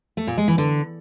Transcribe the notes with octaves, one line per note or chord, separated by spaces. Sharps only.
A3
A#2
G#3
E3
D3